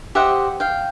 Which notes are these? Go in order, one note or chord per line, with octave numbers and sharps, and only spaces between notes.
G4 C5 D#5 E5 F#5
F5 G5